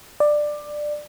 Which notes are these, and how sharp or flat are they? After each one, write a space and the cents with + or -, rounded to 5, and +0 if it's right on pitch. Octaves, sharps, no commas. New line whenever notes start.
D5 +15